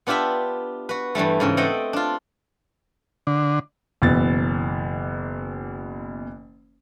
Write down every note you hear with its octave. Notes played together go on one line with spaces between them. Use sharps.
B3 D4 F4 G4 E5 B5
F#4 B4
G2 E3 G3 A3
G#2 C#3 E3
A3 C4 A4 D#5 F#5 G5
D4 F4
D3
F#1 B2 E3 A6